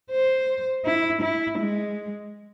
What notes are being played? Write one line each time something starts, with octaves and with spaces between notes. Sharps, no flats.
C5
E4
E4
G#3